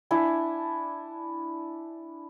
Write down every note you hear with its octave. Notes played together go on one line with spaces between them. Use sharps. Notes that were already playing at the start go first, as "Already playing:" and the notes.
D4 E4 G#5